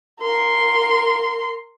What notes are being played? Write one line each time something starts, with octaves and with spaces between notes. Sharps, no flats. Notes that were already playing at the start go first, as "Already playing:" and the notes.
A#4 C6